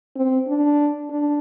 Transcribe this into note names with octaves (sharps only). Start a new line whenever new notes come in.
C4
D4
D4